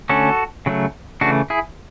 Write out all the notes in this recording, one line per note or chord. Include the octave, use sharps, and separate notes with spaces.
D3 A3 C#4 F#4 A4
C#3 F#3 A3
C#3 E3 A3 D4 F#4
E4 G#4